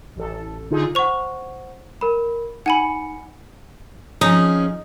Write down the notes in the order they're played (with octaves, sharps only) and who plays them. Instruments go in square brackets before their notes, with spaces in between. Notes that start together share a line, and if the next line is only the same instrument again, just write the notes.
[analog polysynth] A1 A4
D3 D#4 F4 G#4
[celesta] C5 F#5 [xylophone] C#6 F7
[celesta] A#4 B5
[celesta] D#4 C#7 [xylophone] F#5 G#5 B5
[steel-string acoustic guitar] F3 C#4 G#4 [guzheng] D#4